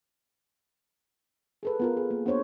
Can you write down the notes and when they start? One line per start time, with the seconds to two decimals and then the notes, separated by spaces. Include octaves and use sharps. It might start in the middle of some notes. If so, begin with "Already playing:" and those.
1.63 G#4 A4 B4
1.80 B3 F4 A#4
1.97 G#4
2.11 A#3
2.26 B3 D4 C5 C#5